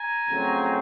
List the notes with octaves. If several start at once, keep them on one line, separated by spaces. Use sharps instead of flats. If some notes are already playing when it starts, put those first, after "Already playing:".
Already playing: G#5 A#5
F2 C#3 F#3 A3 C4